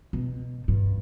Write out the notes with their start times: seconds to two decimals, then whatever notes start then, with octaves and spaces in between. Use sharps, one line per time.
0.13 B2
0.68 G2